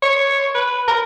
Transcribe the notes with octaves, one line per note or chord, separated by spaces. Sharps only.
C#5
B4
A#4